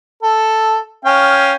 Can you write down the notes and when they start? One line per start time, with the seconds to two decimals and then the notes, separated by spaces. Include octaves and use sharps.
0.23 A4
1.05 C#4 F5 G5